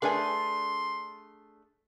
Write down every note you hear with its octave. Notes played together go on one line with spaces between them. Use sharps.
A3 D4 G#4 A#4 B4 G#5 C6